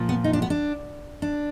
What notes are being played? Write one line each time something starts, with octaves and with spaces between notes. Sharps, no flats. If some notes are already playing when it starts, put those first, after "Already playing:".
Already playing: A#2 F3
B3
D#4
D4
B3
D4
D4